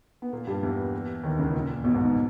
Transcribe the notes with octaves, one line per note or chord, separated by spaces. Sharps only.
B3
A#2 A#3
G2 G3
E2 E3
D#2 D#3
C#2 C#3
A#2
A#2
B1 B2
G#2
B2